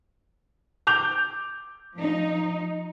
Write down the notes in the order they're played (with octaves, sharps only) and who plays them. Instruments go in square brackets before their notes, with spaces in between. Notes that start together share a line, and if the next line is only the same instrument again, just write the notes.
[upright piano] D6 G6 F7
[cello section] F3 D#4